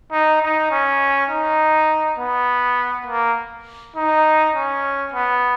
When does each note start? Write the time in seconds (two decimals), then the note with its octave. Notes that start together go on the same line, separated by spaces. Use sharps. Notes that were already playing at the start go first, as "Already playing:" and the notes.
0.12 D#4
0.42 D#4
0.71 C#4
1.30 D#4
2.19 B3
3.06 A#3
3.96 D#4
4.55 C#4
5.13 B3